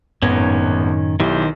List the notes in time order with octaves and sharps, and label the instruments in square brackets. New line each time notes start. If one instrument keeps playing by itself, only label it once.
[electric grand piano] G#1 B3 G#6 [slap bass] F#2 A2 [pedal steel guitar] D#3 C#4
[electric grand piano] B1 E4 G4 [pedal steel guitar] D#3 C5